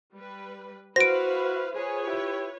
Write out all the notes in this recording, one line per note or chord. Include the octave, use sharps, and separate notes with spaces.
G3 B4
E4 F#4 B4 C5 F5 A#6 D7
F4 G#4 B4 C#5
E4 G4